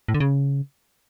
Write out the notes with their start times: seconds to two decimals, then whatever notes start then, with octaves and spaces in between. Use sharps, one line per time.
0.08 A2
0.14 D3
0.20 C#3